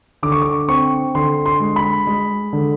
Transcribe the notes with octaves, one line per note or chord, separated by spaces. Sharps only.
D3 D6
C#6
D6
C4 C#6
D3 C6
C6
G#3
B5
G#3
D3